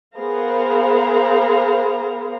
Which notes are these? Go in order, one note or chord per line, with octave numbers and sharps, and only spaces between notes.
B3 G#4 A#4 C5 F5 A#5